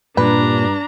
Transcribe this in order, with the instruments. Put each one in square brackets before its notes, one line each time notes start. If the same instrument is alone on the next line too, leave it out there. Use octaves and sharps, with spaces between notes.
[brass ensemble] G2 [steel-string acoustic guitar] A#2 [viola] D4 A#5 [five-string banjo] B4